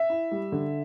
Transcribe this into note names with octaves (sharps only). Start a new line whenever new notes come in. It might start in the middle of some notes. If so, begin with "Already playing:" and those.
Already playing: E5
E4
G3
D3